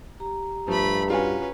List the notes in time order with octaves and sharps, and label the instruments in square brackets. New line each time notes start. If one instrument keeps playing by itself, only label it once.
[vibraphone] G4 A#5
[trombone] G2 [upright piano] F3 [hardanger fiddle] A3 B5
[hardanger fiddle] C#4 B4 [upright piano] F4 F#4 G#5